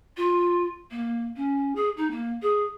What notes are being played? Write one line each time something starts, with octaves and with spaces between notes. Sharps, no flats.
F4
A#3
C#4
G#4
D#4
A#3
G#4